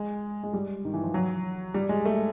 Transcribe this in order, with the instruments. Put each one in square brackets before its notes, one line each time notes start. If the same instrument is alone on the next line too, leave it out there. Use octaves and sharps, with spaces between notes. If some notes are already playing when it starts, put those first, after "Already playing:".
Already playing: [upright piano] G#3
G#3
G3
D#3
E3
F3
F#3
G3
G#3
A3